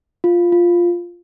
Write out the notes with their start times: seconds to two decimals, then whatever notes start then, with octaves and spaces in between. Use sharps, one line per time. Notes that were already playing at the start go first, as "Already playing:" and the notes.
0.24 F4
0.52 F4